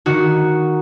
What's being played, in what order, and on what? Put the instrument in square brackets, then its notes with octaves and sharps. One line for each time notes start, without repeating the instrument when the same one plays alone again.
[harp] D#3 D#4 F#4